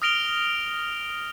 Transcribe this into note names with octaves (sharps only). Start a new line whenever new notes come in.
D#6 F6 A#6 D7 F7 G7